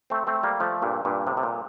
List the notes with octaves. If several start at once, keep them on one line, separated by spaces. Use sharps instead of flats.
A3 C4
A3 C4
G3 A#3
F3 A3
G2 A#2
G2 A#2
A2 C3
C3
A#2